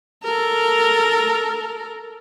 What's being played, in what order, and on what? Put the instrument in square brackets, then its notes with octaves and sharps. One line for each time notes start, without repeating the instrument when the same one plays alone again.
[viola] A4 A#4